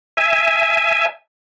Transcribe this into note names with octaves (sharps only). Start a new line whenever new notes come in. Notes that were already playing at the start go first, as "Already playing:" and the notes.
E5 G#5